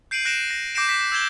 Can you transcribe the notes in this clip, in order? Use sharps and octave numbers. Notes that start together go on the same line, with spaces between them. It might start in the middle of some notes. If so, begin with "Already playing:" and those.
G6 C7 D7 D#7 F#7
F#6 A#6 D7 E7
A#6
D6 G6 A#6 C7 D7 E7
B6
E6 G6 G#6 E7 G7